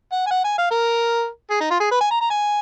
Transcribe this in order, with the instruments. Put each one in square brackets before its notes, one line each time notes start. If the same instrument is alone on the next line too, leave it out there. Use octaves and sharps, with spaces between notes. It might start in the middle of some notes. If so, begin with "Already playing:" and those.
[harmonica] F#5
G#5
F#5
G#5
F5
A#4
G#4
D#4
F4
G#4
B4
G#5
A#5
A#5
G#5